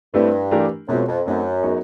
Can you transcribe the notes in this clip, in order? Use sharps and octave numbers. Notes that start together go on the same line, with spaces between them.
G2 A3 C4 E4
E3 A3 D4 G4 A#4
F#2 B2 G#3 C4 F4
F2
F#2 A3 C4 D#4
F#3 B3 D#4 G#4 C#5